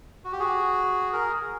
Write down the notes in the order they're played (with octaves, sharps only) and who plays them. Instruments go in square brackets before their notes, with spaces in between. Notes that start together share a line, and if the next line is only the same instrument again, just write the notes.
[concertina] F#4
G4
F#4 G#4
G#4 A#4